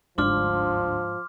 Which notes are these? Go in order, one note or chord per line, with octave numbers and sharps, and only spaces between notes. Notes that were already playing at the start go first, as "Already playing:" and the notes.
G1 D2 G#2 F3 D4 C6 D6 F6